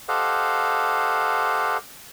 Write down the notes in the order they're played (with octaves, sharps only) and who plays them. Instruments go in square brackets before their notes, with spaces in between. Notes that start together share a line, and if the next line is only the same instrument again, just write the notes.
[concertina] G4 A4 C5 D#5 F5 F#5